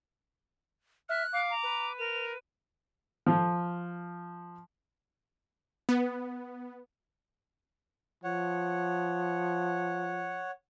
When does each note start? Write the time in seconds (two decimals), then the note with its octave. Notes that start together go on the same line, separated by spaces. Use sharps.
1.09 E5 F6 F#6
1.33 F5 D6
1.51 A#5
1.63 B4
1.99 A#4 F7
3.26 F3
5.89 B3
8.24 F3 C#5 F#5